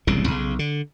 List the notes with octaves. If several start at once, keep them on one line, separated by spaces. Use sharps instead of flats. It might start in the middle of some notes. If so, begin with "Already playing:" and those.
E1 C2 A#2 C#3
B1 C#3
D3